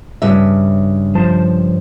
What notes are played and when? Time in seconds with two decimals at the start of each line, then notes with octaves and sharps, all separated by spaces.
0.22 G2 C#3 E5
1.15 F3 C5 A5